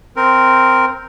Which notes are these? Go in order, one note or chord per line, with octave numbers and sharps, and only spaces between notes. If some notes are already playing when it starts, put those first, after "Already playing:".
C4 A#4